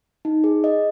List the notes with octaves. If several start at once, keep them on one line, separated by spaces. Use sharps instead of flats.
D#4
G#4
D#5